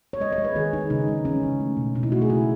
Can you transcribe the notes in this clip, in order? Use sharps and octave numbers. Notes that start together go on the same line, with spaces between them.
C#5
G#3 D#5
C#5
G#3
B4
D#3 G#4
G#3 D#4
C#3 D#4
G#3
E3 C#4
C#3
A3
B2
B2 D#4
E4
A3 F#4
G#4
C#3 E4